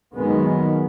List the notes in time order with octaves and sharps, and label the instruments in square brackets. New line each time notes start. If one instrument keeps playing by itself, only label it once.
[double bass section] F#2 D#3 G#3 B3